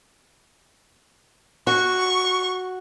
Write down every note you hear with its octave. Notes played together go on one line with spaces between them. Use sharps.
F#4 C#6